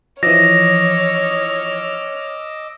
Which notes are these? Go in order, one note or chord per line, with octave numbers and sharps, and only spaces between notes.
E3 F3 C#5 D#5 D6 E6 F6 A#6